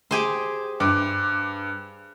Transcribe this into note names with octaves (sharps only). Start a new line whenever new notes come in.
G4 G#4 C5
G2 D6